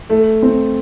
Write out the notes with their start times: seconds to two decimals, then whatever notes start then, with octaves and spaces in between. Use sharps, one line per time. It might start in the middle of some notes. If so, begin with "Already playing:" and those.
0.10 A3
0.42 C4